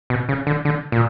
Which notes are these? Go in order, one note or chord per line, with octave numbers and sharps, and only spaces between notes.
B2
C#3
D3
D3
A#2